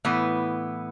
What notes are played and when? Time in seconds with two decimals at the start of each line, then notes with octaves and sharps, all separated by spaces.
0.05 A2 E3 B3